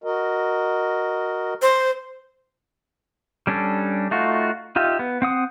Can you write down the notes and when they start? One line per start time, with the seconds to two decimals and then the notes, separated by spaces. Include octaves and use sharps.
0.04 F#4 A#4 D#5
1.62 C5
3.47 G3 C#4 D4 A4
4.11 A3 D#4 F4 F#4
4.76 D#4 F4 G4 E5
4.99 B3
5.22 C4 F#5 D#6